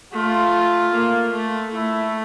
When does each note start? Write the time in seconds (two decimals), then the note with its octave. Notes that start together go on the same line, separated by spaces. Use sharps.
0.13 A3 F4
0.92 A#3
1.32 A3
1.71 A3 E4